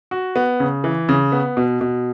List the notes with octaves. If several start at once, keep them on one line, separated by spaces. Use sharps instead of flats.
F#4
B3
C#3
E3
C#3
B3
B2
B2